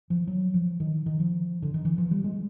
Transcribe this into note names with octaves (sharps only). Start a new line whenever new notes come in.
F3
F#3
F3
D#3
D#3
F3
D3
D#3
E3
F3
G3
G#3